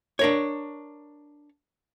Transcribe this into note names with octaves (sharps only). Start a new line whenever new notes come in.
D4 A#4 C#5